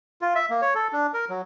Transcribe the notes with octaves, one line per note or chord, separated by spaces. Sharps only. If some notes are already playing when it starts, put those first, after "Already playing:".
F4
E5
A#3
C#5
A4
D4
A#4
F#3